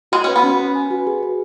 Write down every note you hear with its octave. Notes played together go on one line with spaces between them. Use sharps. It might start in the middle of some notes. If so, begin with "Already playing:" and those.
G#3 F#4
C#4 B4
B3
C#4
B4
G#5
F#4
G#4
B4